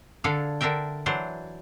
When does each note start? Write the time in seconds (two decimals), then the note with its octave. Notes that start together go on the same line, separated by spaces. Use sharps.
0.24 D3 D4 G#4 A4 F5
0.61 D3 D4 A#4 E5 G5
1.06 E3 F#3 D4 C5